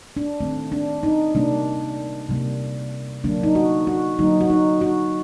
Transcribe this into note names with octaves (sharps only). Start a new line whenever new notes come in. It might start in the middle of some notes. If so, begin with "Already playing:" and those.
D4
D#3 A3 C4
D4
D#4
C3 G3 A#3 D4
C3 G3 A#3
D3 F#3 A#3 D4
D#4
F#4
F#4
D3 F#3 A#3 D#4
F#4
D#4
F#4